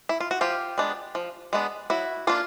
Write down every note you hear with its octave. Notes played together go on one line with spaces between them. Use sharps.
E4
F4
F#4
F3 F4 G4
G#3 B3 D4
F3
G#3 B3 D4
F#3 E4 F#4
A#3 D4 F4